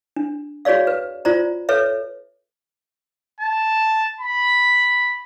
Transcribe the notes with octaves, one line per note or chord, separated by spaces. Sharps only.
D4
F#4 G#4 C#5 D5 F5
B4
F4 C5 D5 A#5
A4 B4 C#5 E5
A5
B5